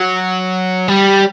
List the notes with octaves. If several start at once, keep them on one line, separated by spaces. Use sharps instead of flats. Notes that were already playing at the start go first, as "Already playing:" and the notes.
Already playing: F#3
G3